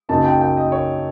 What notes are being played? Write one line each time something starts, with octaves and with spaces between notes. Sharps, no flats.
F#2 C#3 F#3 A#3 D#4 A5
G5
G5
D#5
C#5